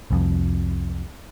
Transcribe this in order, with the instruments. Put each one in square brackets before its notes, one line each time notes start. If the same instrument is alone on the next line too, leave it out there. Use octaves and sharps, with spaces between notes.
[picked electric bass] C2 F2